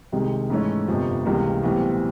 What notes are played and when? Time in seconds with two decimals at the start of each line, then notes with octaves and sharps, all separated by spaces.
0.12 C2 C3 D#3 G#3
0.50 G#2 E3 A3 C#4 E4
0.88 G1 F2 C3 F3
1.25 C#2 C3 E3 G3 A#3
1.63 B1 A2 E3 G3 C4